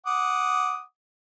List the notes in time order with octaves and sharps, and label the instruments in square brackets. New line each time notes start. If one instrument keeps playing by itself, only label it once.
[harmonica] F#5 D6 D#6